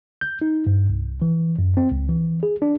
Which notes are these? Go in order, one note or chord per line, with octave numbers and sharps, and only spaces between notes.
G6
D#4
G2
C2
E3
F#2
C4
C#2
E3
G#4
D4